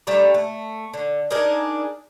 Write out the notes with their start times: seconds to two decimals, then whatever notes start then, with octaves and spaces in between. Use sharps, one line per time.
0.07 G3 A3 D4 A#5
0.34 A3
0.94 D3
1.31 D4 D#4 G#4 A#4